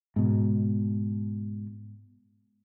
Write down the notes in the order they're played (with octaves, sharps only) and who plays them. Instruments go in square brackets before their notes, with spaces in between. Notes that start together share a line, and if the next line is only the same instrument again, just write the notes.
[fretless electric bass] G#2 B2